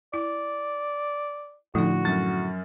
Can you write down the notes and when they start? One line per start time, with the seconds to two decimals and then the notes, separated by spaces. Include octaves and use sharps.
0.14 E4 D5
1.75 A2 D3 F3 D#4 F#4
2.05 F#2 A6